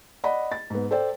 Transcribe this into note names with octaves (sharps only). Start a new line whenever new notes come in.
D5 D#5 F#5 B5
A6
G#2 B3
A4 C5 D5 G5